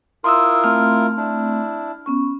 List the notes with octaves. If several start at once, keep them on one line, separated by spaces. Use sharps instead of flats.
E4 F4 A#4 C6 D#6 E6
A3 C4 F6
D4 E4
B3 C#4 C#6